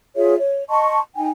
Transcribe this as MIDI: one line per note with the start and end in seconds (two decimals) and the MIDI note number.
0.16 0.34 65
0.16 0.34 68
0.16 0.34 73
0.16 0.34 76
0.38 0.65 73
0.68 0.99 75
0.68 0.99 81
0.68 0.99 84
0.68 0.99 85
1.15 1.29 63
1.15 1.29 79
1.15 1.29 80